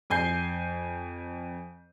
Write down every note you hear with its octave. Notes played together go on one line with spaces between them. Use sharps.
F2 G#5 G6 C7